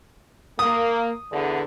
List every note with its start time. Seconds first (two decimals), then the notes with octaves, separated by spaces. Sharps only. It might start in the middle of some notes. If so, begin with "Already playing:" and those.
0.59 A#3 D#6
1.32 E2 D3